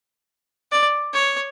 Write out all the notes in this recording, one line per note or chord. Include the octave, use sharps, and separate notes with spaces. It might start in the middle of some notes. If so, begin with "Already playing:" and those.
D5
C#5